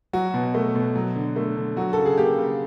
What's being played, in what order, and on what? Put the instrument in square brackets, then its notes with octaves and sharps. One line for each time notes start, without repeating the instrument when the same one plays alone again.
[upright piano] F#3 F#4
B2
A3
B2
F#3
D3
A3
D3
F#3 F#4
C#3 A4
G#4
A#3 G4
C#3